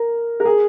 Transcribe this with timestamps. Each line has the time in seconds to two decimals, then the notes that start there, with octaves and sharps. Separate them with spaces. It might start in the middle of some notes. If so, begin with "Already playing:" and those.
Already playing: A#4
0.40 A#4
0.45 G#4